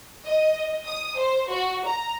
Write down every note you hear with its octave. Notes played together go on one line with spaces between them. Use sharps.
D#5
D#6
C5
F#4
A#5